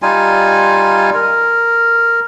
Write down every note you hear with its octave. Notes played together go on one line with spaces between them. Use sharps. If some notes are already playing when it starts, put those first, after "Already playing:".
G3 D#4 F4 G#5
A#4